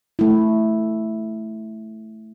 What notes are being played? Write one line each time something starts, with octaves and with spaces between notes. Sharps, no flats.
A3 E4